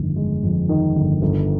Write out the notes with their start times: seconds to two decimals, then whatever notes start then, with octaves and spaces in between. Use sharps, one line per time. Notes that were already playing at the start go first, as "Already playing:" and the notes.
Already playing: G1 F2 D#3
0.16 G#3
0.43 F2
0.69 D#3
0.96 G1
1.22 G1